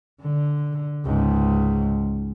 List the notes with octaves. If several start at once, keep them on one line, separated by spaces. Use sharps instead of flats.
D3
C#2 G#2